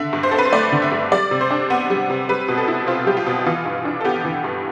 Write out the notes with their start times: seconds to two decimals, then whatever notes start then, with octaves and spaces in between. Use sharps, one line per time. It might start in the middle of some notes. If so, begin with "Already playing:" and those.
Already playing: D3 E5
0.13 G2
0.23 C5
0.31 C4 A4
0.38 B4
0.45 C5
0.53 A3 D5
0.72 D3
0.82 E5
0.92 G2
1.12 G3 D5
1.31 C3
1.41 C5
1.51 D4
1.70 B3
1.90 G3
2.10 C3
2.29 G3 B4
2.48 B2
2.58 A4
2.68 E4
2.87 C4 F4
3.07 G3 G4
3.17 F4
3.27 B2
3.46 E3 F4
3.66 G2
3.85 D4
4.01 A4
4.05 B3 G4
4.25 E3
4.44 G2